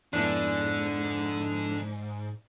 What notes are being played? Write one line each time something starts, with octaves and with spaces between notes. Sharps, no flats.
F2 G#2 D3 B3 D4 E4